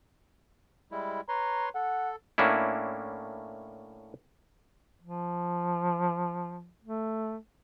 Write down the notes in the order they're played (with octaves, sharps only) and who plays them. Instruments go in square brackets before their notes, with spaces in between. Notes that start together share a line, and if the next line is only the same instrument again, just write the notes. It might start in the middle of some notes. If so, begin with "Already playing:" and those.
[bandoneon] G3 G#3 E4
[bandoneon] B4 C#5 C6 [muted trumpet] A#5
[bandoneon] A4 [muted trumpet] F#5
[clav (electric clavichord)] A2 A#3 C#4 D4 E4
[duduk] F3
A3